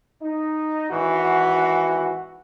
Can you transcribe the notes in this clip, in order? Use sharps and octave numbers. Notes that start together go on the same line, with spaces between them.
D#4
G#1 E3 F#4